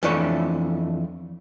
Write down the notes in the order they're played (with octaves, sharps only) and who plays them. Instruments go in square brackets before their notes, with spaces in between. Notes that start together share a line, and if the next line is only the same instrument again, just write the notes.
[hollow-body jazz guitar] F2 E3 A3 D4 C#5